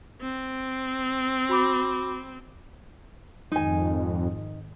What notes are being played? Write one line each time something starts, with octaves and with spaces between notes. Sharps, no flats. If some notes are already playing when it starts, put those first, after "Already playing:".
C4
F#4 B5 D6
F2 G#2 D#3 D#4 G#5